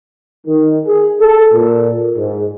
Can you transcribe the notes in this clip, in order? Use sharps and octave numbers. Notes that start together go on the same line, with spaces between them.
D#3
G#4
A4
A#2
G#2